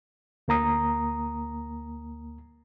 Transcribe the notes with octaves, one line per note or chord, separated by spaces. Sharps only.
D2 A#3 A#5 D#6